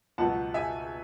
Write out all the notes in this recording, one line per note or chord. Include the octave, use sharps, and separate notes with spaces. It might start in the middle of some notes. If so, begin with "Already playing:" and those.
C#2 B2 F#3 F#5 A5
E5 G#5